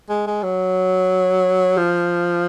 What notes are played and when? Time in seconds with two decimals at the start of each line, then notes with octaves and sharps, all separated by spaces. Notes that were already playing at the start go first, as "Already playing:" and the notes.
0.09 G#3
0.27 G#3
0.43 F#3
1.77 F3